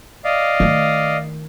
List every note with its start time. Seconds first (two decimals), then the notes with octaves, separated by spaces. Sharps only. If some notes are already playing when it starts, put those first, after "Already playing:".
0.24 D5 D#5 F5
0.60 D#3 A3